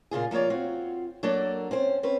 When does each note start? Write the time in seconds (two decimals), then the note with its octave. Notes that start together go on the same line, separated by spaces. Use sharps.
0.11 A#2 C#3 F4 G#4
0.31 F3 A#3 F4 C#5 D5
0.50 C4 F4 F#4
1.23 F#3 A#3 D4 A4 A#4
1.71 C4 C#4 C5
2.03 C4 C#4 B4